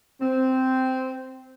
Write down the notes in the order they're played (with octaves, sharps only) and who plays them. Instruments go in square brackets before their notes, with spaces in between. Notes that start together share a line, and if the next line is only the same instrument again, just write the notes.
[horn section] C4